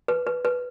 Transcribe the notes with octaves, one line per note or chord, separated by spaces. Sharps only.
B4
B4
B4